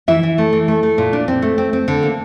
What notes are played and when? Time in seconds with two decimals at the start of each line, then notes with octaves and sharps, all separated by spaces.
0.08 E3 E4 E5
0.23 E3
0.38 A3
0.53 E3
0.68 A3
0.83 A3
0.98 A#2
1.13 D4
1.28 C4
1.42 A3
1.58 C4
1.73 C4
1.88 D3
2.03 A#3